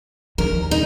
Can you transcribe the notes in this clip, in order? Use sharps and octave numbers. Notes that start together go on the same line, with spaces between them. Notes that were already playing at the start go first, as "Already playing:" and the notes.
D#2 D#3 A#4
D#4